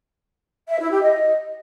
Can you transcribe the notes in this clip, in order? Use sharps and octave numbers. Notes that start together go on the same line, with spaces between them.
E5
E4
G4
D#5